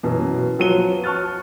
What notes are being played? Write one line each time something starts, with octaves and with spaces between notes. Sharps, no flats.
F#2 B2 E3
F3 F#3 B3 D#7 G7
A5 C#6 F6 F#6 A6